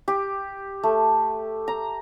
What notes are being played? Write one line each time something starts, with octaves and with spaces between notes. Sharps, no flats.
G4
A3
A#5